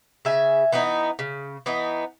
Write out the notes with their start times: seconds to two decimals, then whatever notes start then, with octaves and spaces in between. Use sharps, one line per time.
0.25 C#3 E5 G#5
0.72 E3 B3 D#4
1.19 C#3
1.66 E3 B3 D#4